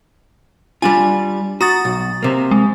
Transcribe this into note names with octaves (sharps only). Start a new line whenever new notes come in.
G3 D4 F4 G#5
F#4 A#5 D#6 A6
B1
C3 A#3
G#3